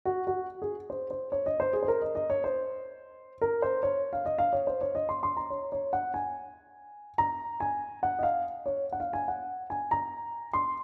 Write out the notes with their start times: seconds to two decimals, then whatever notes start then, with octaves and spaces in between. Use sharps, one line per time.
0.05 F#4
0.27 F#4
0.62 G#4
0.90 C5
1.10 C5
1.32 C#5
1.46 D#5
1.60 C5
1.73 G#4
1.83 C5
1.88 A#4
2.02 D#5
2.15 D#5
2.30 C#5
2.44 C5
3.41 A#4
3.62 C5
3.83 C#5
4.13 F5
4.26 D#5
4.38 F5
4.53 C#5
4.67 C5
4.81 C#5
4.95 D#5
5.09 C6
5.23 C6
5.37 A#5
5.50 C#5
5.72 C#5
5.93 F#5
6.14 G#5
7.18 A#5
7.60 G#5
8.03 F#5
8.19 D#5
8.23 F5
8.66 C#5
8.92 F#5
9.00 F5
9.13 G#5
9.28 F#5
9.70 G#5
9.91 A#5
10.53 C6